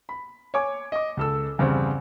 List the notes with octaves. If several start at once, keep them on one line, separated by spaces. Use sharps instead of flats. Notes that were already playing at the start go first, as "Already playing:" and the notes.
B5
C#5 G#5 D6
D#5 D6
C#2 A4 E6
E2 G2 C#3 C4